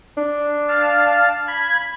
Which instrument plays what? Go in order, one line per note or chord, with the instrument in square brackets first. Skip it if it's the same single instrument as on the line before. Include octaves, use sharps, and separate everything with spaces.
[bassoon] D4
[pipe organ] F5 A5
B5 G#6